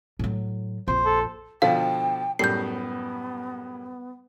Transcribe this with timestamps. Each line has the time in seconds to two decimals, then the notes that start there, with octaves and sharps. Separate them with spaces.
0.19 A2 F#3
0.88 A#1 F2 C5
1.06 A4
1.62 B2 D3 F3 F5 G5
2.39 F#2 A2 G3 B3 G6 C7